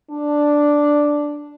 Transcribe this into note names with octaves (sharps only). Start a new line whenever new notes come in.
D4